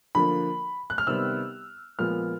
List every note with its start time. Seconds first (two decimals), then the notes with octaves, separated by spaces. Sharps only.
0.15 D3 F3 A#3 B5
0.90 F#6
0.98 F6
1.07 C3 D#3 G3 B3 E6
1.99 A#2 F3 G#3 B3 F6